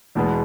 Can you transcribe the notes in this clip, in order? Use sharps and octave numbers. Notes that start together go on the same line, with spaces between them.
E2 B2 G#3 B3